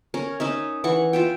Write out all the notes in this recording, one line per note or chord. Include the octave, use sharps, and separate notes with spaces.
C#4 A#4
C#4 D#4 E5
E3 F#5 C#6
F4 E5 G5